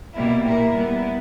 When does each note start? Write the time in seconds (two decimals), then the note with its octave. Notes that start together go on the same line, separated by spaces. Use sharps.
0.13 B2 G3 A#3 E4
0.43 A#2 A#3 E4 A#4
0.73 G3 B3 E4